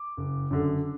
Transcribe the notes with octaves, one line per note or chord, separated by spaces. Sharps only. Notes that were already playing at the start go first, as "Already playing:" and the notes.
Already playing: D6
F#1
F#2 D3